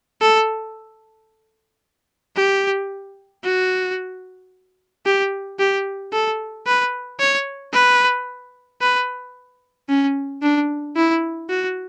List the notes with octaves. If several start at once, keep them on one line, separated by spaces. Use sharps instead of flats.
A4
G4
F#4
G4
G4
A4
B4
C#5
B4
B4
C#4
D4
E4
F#4